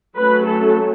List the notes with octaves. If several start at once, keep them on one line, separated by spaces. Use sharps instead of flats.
F#3 A3 C#4 B4
A4